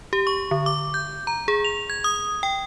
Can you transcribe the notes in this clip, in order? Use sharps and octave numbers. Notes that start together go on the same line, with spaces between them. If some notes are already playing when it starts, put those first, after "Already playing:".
G4
C#6
D3
D6
G6
A#5
G#4
F7
G#6
D#6
G5